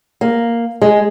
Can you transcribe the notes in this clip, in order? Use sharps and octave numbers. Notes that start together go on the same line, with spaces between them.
A#3
G#3